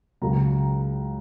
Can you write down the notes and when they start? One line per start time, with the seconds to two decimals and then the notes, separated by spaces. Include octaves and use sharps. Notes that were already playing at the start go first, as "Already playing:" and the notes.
0.21 C#2 C#3 F#3 A#5